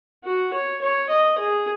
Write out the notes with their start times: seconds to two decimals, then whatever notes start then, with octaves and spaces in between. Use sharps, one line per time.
0.24 F#4
0.53 C#5
0.81 C#5
1.09 D#5
1.38 G#4